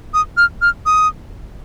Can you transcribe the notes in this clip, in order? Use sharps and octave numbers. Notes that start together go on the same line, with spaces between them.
D#6
F6
F6
D#6